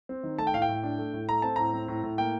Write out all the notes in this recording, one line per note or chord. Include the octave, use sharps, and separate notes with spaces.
C4
D#3
A3 A5
G5
A2 F5
G5
A2
D4
A3
A2
A3 A#5
C4 A5
A2 A#5
C4
A2
A2
A#3 G5